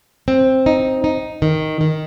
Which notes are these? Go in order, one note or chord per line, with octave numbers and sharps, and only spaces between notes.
C4
D#4
D#4
D#3
D#3